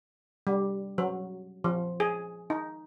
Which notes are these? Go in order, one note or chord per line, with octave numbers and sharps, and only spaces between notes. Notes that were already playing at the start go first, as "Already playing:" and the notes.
G3
F#3
F3
G#4
D#4